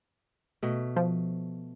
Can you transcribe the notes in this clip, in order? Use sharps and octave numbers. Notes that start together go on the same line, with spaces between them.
B2 A3
F3